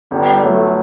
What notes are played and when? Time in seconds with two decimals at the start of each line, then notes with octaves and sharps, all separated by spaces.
0.11 G1 G3
0.43 F#3 A3